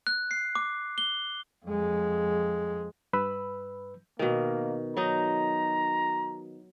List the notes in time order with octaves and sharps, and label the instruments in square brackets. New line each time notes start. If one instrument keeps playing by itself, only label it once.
[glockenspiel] F#6
C7
D6
G7
[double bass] F2 G#3
[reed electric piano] G2 B4 B5 E6
[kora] B2 D#3 [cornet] A#3
[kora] F#3 D#4 [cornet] A#5